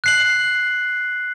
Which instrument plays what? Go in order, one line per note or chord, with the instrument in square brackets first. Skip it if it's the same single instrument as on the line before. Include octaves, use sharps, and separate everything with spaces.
[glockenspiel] F#6 C7 F#7